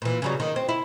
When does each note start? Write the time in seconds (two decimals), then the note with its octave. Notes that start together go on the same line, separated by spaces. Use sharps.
0.02 A#2 E3
0.22 C#3 F#3 G3
0.40 D#3
0.56 C4
0.69 E4